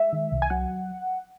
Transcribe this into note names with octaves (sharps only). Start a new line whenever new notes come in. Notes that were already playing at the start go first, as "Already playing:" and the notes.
Already playing: G#3 E5
D#3
C2
G#5
F#3 F#5